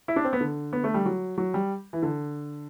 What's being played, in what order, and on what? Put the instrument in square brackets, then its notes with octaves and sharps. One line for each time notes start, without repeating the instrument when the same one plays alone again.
[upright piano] E4
D4
C4
B3
D3
B3
A3
G3
F#3
F#3
G3
E3
D3